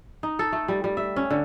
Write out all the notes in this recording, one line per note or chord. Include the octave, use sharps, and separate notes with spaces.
D#4
A4
A3
G3
G3
E5
C#4
D3